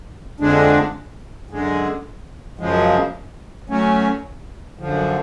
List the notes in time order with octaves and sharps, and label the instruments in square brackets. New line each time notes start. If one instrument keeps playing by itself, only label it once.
[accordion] F2 D3 G#3 D4
F#2 D3 G#3
F#2 C#3 F3 G#3
F#3 A3 C#4
F#2 D3 F3